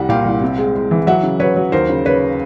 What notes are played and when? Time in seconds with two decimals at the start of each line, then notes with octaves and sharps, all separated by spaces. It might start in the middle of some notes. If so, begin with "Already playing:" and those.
Already playing: C2 G3 F#5
0.09 A#2 F5 G5
0.25 C2
0.41 C3
0.58 G#3
0.75 G#3
0.91 E3
1.07 F#3 E5 F#5
1.23 C#3
1.40 F#3 B4 C#5
1.56 F#3
1.72 D#2 A#4 C5
1.89 C#3
2.06 C#3 B4 C#5